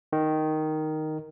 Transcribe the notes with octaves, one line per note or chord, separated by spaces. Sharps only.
D#3